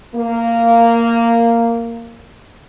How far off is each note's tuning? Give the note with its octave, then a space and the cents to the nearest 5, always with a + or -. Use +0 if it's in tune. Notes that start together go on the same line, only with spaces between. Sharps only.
A#3 -10